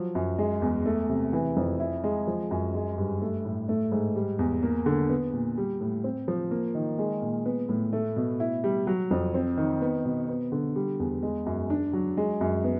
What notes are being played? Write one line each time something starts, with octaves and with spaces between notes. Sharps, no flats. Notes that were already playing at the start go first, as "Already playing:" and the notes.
Already playing: F3 F#3
F#2
G#3
E2
A3
C3
E3
F2
E4
G#3
F3
F#2
G#3
G2
A3
A2
A3
G#2
G3
E2
A#3
D3
B3
A#2
G3
A2
C4
F3
A#3
D#3
G#3
A#2
B3
A2
A3
B2
E4
G3
F#3
F2
C4
D#3
B3
B2
B3
D3
G3
E2
G#3
F#2
D4
F#3
G#3
F#2
B3